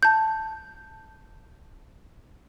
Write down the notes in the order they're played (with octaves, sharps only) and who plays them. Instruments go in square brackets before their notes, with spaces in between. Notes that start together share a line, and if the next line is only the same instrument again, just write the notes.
[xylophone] A5 G6